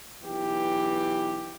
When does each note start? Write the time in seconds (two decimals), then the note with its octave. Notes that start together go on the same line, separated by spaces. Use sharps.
0.22 B1 E3 G4